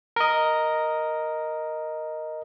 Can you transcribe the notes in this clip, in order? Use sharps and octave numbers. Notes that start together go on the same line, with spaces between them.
A#4 D#5